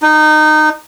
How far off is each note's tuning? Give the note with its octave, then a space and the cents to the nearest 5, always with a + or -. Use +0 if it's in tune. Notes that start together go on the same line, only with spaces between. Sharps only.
D#4 -20